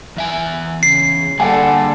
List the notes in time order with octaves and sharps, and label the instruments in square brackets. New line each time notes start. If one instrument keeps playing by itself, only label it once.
[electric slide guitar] E2 E5 G#5
[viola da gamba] C#3 [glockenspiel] C7
[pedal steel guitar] D3 F#5 G#5 [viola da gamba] G3 A4 [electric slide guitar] A#3 G#4 A5